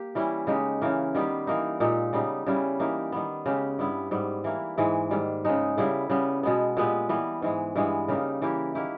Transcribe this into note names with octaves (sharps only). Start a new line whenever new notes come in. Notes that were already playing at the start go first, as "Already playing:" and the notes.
Already playing: A#3 G4
E3 G3 C#4 E4
C#3 G#3 D#4 G4
C#3 E3 A#3
D#3 G3 B3 G4
E3 A#3 D#4
A#2 G#3 D#4 G4
C#3 G3 B3 D#4
C#3 G3 C#4 E4
E3 A#3 D#4 G4
D#3 G3 B3
C#3 G#3 C#4 G4
G2 G3 B3 E4
G#2 G3 B3
E3 A#3 E4
G#2 E3 G#3
G#2 D#3 G3
C#3 G#3 D#4
C#3 G3 B3 E4
C#3 G3 B3
B2 G#3 B3
A#2 G#3 B3 G4
E3 G3 B3
G#2 E3 G#3
G2 E3 G#3 B3
C#3 G3 A#3 D#4
E3 A#3 E4 G4
D#3 A#3 E4 G4